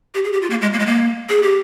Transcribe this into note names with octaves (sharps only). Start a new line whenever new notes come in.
G4
G#4
G4
F4
A#3
G#3
A#3
G#3
A#3
G#4
G4